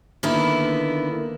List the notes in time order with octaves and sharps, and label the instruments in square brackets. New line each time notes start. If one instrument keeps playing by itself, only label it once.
[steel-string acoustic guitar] D3 D#3 A#3 B3 E4